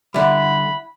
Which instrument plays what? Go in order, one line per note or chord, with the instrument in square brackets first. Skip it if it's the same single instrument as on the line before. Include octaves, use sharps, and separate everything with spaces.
[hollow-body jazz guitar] D3 G3 [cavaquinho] E4 F#5 [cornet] B5